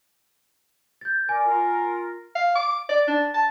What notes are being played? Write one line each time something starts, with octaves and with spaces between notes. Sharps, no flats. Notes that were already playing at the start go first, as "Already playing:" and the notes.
G6 A6
A#4 D5 G#5
F4 A#4
F5
D6
D5
D4
A5